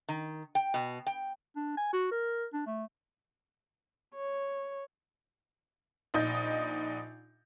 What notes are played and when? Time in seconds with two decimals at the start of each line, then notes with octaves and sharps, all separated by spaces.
0.09 D#3
0.55 G5
0.74 B2
1.07 G5
1.56 D4
1.77 G#5
1.93 F#4
2.11 A#4
2.53 D4
2.66 A3
4.15 C#5
6.14 A#1 D#4 D#5 G6